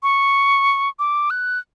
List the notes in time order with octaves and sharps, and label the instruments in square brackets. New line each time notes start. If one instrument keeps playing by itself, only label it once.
[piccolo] C#6
D6
F#6